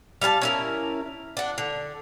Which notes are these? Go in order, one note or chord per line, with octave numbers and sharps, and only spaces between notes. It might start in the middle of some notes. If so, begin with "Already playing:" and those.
G3 F5 G#5 A5
C#4 E4 A#4
D4 F#5
D3